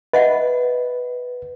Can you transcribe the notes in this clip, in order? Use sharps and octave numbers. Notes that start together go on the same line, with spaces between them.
B4 D#5 E5 F#5